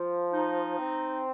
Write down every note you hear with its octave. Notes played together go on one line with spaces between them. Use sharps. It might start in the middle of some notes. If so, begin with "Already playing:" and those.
Already playing: F3
D#4
C4